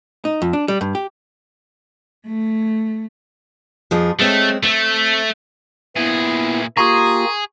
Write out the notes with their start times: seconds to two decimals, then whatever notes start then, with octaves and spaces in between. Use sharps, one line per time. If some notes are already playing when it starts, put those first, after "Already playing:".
0.25 D#4
0.42 F2
0.53 D4
0.68 G3
0.81 G2
0.95 G4
2.25 A3
3.91 F2 F3 G#4
4.19 G#3 A3 C4 C#5
4.63 A3 C4
5.96 A#2 B3 E4 G#4
6.77 A#3 F4 G4 G#4 A#5 C6 C#6 D#6